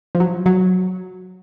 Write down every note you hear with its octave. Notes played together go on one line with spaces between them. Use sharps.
F3
F#3
F#3